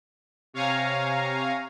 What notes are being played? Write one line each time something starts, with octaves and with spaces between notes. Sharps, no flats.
C3 C#5 F5 G#5 A#5